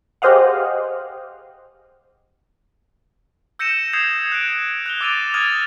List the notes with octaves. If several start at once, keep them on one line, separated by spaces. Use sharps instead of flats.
G4 G#4 C5 D#5 F5 F#5
E6 G6 A#6 C#7 D#7 E7
D#6 G6 G#6 C7 E7 F7
F#6 D7
F#6 F7 G7
D6 E6 A6 D7 D#7 F7
D#6 F6 G#6 A6 D#7 F7